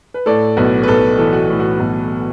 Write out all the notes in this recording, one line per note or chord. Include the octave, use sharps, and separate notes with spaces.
B4
A2 A4 D5
B1 F#4 B4
B4
B1 A4
E3 A4
F#4
A2
F#4
B1